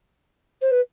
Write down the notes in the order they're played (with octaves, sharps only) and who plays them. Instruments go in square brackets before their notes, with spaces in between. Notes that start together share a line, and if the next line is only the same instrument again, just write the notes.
[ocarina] C5
B4